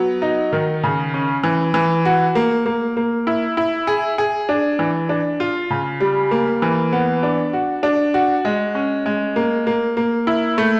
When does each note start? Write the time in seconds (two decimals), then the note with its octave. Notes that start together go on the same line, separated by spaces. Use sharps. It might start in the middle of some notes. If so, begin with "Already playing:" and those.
Already playing: F#3 B3
0.22 D#4
0.53 D#3
0.83 C#3
1.14 C#4
1.44 E3
1.74 E3
2.05 F#4
2.35 A#3
2.66 A#3
2.97 A#3
3.27 E4
3.57 E4
3.87 G#4
4.18 G#4
4.49 D4
4.79 E3
5.09 D4
5.40 F4
5.70 C#3
6.00 G3
6.31 A#3
6.62 E3
6.93 B3
7.23 D4
7.53 F#4
7.83 D4
8.14 F#4
8.45 G#3
8.75 C#4
9.06 G#3
9.36 A#3
9.67 A#3
9.97 A#3
10.27 E4
10.58 A3